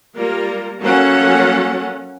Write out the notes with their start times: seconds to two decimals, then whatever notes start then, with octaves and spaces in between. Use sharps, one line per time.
0.16 G3 A#3 F4 A#4
0.81 F#3 A#3 C#4 A4 F#5